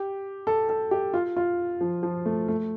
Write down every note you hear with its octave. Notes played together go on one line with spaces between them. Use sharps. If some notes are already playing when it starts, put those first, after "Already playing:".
Already playing: G4
A4
A4
G4
F4
F4
F3
F3
A3
A3